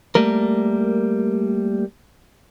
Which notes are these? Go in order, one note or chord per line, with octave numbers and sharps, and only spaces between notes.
G3 A3 A#3 A#4